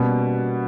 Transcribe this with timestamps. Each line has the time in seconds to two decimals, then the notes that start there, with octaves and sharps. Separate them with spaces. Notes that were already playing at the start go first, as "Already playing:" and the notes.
Already playing: B2 G3 A#3 B3 C#4